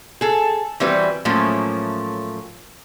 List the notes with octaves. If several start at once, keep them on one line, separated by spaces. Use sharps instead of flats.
G#4 A4
E3 G3 C4 F#4 B4
A2 F3 F#3 A3 A#3 C#4